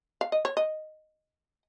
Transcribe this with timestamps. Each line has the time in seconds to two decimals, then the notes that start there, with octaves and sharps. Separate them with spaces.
0.21 F5
0.32 D#5
0.45 C#5
0.57 D#5